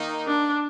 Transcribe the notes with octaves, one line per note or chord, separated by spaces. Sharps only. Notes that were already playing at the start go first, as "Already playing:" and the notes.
Already playing: D#3 A#3 D#4
D4